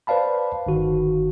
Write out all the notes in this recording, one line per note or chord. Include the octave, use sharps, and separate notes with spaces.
B4 C5 D5 F5 A5 B5
G1 D#3 F#4